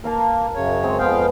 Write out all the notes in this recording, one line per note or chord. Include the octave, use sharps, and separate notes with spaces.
A#3 A#4 F5 A5
F#2 C#3 C#5
G#3 C4
F2 F3 B3 G#4 F5 G5